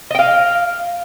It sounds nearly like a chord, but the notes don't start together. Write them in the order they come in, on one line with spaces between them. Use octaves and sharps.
D#5 G5 F5